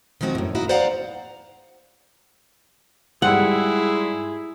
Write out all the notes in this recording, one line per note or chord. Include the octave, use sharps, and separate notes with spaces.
D#3 F3 G#3 C4 F#4
F#2 A2
A#3 D#4 E4 F#4
C5 D5 F5 F#5 A#5
G#2 G3 E4 G#4 F#5